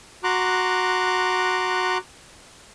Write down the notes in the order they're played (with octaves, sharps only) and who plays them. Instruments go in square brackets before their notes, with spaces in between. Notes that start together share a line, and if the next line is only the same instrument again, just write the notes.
[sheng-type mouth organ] F#4 A#5 C6 D6 F#6